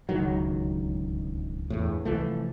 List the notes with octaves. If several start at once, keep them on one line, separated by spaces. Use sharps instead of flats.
D1 C#2 D#3 F#3
G1 E2 A2
C2 E3 F3 A3